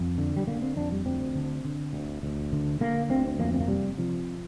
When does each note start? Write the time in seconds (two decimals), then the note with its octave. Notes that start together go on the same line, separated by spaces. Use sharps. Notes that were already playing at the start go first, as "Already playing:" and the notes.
Already playing: F2
0.18 D3
0.37 G3
0.47 D3 A#3
0.62 C4
0.76 F2 D4
0.92 G3
1.06 D2 C4
1.35 D3
1.65 D3
1.93 D2
2.23 D2
2.52 D3
2.81 D3 A#3
3.10 D2 C4
3.27 C4
3.39 F2 A#3
3.54 C4
3.60 A#3
3.68 C3 G3
3.98 C3 F3